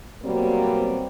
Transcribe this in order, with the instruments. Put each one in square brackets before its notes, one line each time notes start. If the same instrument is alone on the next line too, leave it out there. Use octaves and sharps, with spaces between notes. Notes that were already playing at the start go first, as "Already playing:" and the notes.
[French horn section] B2 F#3 G3 A#3 C4